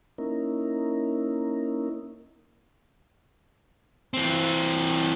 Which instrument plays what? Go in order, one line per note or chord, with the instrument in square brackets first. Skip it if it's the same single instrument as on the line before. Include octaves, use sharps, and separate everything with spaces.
[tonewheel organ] A#3 C#4 D#4 E4 A#4
[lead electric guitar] E3 C4